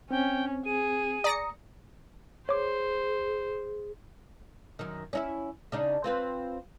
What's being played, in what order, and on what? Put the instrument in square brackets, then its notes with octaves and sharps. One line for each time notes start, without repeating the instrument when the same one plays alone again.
[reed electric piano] C4 [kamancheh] C#4 [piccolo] G5
[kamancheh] G#4 [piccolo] D#7
[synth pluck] D5 A#6 C#7 [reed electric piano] A#5 D#6
[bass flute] G#4 [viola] C5 [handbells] C#5 D6
[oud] F#2 D#3
C#4 D#4 E4
C#3 D4 D#4
C4 F4 B4